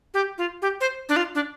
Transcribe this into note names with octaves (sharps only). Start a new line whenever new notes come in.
G4
F4
G4
C5
D4
F4
D4